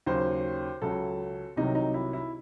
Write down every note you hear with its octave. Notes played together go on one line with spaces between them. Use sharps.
D#2 C#3 F#3 C5
C#2 C#3 F#3 A4
C2 C3 D#3 F#3 D#4
D#4
E4
E4